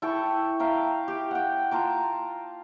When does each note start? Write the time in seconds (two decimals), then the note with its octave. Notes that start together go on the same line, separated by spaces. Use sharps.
0.02 E4 A4 G5 C#6
0.60 E5 F5 G5 A#5
1.08 G4
1.31 F#5 G5
1.71 F4 A5 A#5 D6